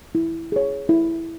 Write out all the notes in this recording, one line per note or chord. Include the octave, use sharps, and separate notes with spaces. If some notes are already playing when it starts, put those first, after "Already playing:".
E4
G#4 C#5
E4